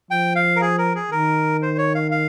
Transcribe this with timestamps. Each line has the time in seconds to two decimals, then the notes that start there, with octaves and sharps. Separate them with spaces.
0.11 F3 G5
0.36 F5
0.56 A#4
0.61 G#4
0.78 A#4
0.95 G#4
1.11 D#3 A#4
1.62 C5
1.78 C#5
1.95 F5
2.11 F5